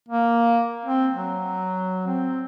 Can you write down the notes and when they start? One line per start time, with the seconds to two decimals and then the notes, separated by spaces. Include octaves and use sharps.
0.09 A#3
0.85 C4
1.12 F#3
2.07 C4